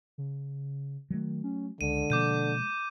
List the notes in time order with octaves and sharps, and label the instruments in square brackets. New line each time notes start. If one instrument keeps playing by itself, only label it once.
[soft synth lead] C#3
[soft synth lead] D#3 [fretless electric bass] F#3 G3 A3
[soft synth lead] C#4
[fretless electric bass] C#2 [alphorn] D3 [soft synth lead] G#3 [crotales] D#7
[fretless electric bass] B2 F3 A#3 [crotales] D6 G6 D#7